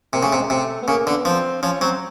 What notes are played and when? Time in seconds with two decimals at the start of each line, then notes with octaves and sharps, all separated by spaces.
0.13 C3 A#3
0.23 C#3 A3
0.33 C3
0.37 G#3
0.48 C3 A3
0.82 B3
0.88 C#3 A#3
1.06 D3 B3
1.25 F3 C4
1.63 F3 C#4
1.81 F#3 C4